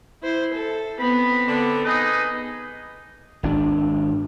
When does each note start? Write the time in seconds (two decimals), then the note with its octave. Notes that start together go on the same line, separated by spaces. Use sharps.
0.23 E4 C5
0.53 A4
0.99 B3 C4 B5
1.46 D3
1.85 D#4 G#4 B4 D#5
3.43 G#1 D4